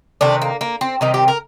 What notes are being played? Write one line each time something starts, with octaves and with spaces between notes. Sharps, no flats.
C3 D#3 A3 D4
A#3
A#3
C4
C3 D#3 G3 D#4
G4
A#4